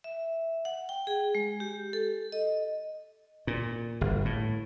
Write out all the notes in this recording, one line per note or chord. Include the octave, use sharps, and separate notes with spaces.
E5
F#5
G5
G#4
G#3
G4
A4
D#5
A#2
G1
A2